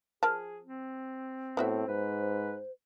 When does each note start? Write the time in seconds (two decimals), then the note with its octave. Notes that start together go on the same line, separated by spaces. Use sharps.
0.23 F3 G#4 A#4 A5
0.63 C4
1.57 A2 B3 F#4 C5 E5
1.88 G#2 B4